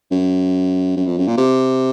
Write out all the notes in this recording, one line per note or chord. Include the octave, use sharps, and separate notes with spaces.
F#2
F#2
F2
F#2
A#2
C3